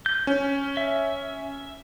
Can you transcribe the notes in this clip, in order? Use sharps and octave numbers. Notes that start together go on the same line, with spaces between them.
G6
C#4
E5